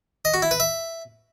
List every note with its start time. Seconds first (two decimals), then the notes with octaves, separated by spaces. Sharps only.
0.25 D#5
0.34 F#4
0.42 E4
0.51 B4
0.60 E5